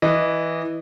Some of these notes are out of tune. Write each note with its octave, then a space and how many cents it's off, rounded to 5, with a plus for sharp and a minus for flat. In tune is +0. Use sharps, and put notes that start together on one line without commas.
E3 -5 D#5 -20